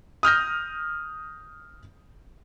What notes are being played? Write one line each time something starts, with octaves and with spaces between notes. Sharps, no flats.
D#6 F6 G6 A#6